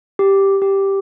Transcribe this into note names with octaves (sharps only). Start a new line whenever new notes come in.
G4
G4